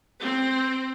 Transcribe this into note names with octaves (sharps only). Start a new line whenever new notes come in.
C4